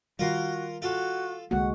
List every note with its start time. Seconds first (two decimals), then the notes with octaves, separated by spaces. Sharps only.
0.19 D#3 G3 F4 F#4 A#4 C6
0.82 F4 F#4 A4
1.51 C2 D3 G#3 A#3 F#4 F#5